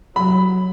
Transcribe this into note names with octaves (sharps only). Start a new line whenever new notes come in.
F#3 B5